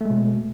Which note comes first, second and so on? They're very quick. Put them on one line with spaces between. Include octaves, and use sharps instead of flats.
A3 G#3 B2